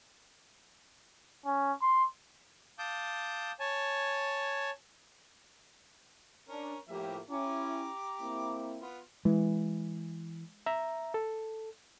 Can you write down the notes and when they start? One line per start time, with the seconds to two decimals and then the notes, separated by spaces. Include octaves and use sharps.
1.46 C#4
1.82 C6
2.79 F5 A5 D6 D#6 G6
3.60 C#5 G#5 A5
6.48 C#4 D4 A#4
6.88 A2 F3 A#3 G4 E5
7.29 C#4 E4 G4 A#5 D6
8.19 A#3 C4 E4
8.80 B3 F4
9.25 E3 G#3
10.66 E5 A#5
11.14 A4